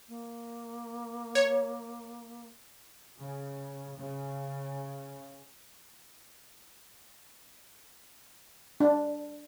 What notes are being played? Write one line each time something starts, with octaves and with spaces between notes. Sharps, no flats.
A#3
C#5
C#3
C#3
D4